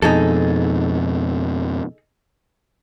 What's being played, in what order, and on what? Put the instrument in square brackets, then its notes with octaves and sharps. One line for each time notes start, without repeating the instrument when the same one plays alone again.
[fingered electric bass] F2 B2 [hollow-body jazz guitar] D#4 G#4 A4